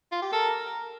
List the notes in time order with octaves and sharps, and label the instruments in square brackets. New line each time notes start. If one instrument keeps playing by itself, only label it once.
[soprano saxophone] F4
G4
[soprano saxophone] A4 [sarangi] A#4